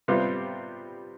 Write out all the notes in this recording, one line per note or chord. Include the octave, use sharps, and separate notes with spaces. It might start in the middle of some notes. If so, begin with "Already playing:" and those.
C3 G3 B3 F4